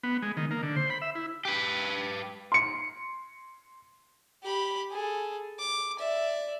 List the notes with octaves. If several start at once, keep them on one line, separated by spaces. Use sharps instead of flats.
B3
G#3
D#3
A#3
D3
C5
B5
E5
E4
G4 B4
C6 C#7
G4 B5
G#4 A4
D6
D5 E5